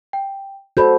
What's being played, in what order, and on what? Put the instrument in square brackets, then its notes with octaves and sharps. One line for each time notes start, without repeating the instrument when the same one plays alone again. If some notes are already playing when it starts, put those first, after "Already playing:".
[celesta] G5
[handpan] F#4 A4 [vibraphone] C5 [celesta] D5 B5 G6